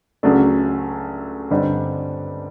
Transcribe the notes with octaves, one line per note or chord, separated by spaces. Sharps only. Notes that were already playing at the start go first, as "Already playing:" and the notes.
C#2 C#3 F#3 A3 D4
G2 D3 G3 C4 D#4